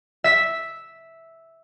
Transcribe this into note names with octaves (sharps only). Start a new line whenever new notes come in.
E5 B6